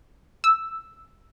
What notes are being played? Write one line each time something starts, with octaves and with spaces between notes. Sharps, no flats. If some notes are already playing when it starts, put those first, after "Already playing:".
E6